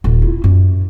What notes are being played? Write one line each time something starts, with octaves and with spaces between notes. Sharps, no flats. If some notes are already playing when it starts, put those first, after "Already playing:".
D#1
E4 F4
F#2